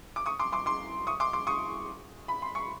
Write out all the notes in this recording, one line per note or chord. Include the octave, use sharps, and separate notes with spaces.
D6
C#6 D#6
C6 D6
C6 D6
C6 D6
C#6 D#6
C6 D6
C6 D6
C#6 D#6
B5
C6
C#6